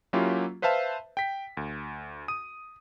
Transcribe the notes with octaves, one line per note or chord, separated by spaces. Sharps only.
F#3 A#3 C#4 E4 F4 G4
B4 C5 E5 F5 A5
G5 B6
D2
D#6 D#7